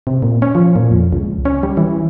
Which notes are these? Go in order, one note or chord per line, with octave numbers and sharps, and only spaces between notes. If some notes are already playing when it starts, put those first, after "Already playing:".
C3
A#2
C#4
F3
A#2
F2
C#2
C#4
G3
E3